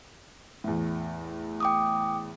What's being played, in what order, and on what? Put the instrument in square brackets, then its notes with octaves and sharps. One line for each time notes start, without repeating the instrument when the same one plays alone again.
[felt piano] E2 A2
[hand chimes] G5 D6 D#6